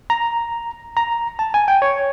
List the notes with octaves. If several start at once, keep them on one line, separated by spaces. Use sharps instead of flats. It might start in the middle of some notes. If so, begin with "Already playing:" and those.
A#5
A#5
A5
G#5
G5
C#5